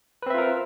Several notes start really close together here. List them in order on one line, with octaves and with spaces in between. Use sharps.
B4 C4 E5 F4 A#4